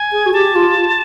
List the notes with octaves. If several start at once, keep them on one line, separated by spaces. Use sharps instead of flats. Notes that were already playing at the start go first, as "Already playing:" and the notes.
Already playing: G#5
G#4
F#4
G4 A5
F4